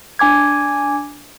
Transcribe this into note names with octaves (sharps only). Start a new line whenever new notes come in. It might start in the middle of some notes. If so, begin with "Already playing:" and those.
D4 G#5 D6 G#6